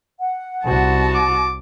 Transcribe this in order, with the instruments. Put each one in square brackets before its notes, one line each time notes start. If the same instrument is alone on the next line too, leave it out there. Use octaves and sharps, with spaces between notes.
[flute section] F#5
[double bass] C2 [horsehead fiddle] F#4 A5
[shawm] D6